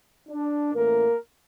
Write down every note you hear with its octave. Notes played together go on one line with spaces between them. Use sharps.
D4
A2 E3 A3 A#3 C#4 A#4